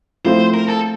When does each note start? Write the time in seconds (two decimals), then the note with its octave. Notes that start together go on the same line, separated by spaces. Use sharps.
0.25 F3 A3 C4 E4 C5
0.54 A#4
0.69 A4